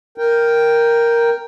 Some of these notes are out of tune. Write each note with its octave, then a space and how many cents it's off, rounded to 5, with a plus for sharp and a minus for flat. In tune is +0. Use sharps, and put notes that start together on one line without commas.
A#4 +0 G5 +0